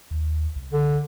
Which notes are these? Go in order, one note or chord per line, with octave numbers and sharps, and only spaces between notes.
D#2
C2
D3